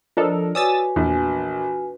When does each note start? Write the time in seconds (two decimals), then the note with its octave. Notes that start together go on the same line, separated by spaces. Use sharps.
0.17 F3 D4 A4 A#4 D#5
0.55 F#4 B4 C#5 D5 G#5 D#6 E6 A6
0.96 A#1 E2